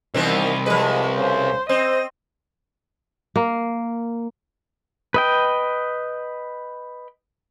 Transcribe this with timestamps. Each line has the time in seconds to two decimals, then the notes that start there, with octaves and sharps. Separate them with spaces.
0.14 C2 D#3 E3 B3 C4
0.66 F3 G#3 B4
1.16 C#3 C5
1.69 C4 C5 D#5
3.36 A#3
5.14 B4 D#5 G5